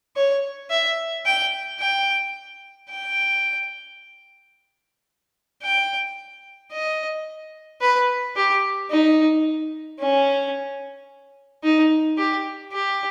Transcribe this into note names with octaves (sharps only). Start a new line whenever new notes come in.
C#5
E5
G5
G5
G5
G5
D#5
B4
G4
D#4
C#4
D#4
G4
G4